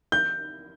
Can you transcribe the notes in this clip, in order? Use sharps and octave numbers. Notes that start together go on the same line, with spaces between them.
G6